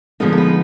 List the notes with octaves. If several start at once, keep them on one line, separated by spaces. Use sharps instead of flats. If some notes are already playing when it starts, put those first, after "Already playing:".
D3 F3 G#3 B3 D#4 A#4
A#4
B4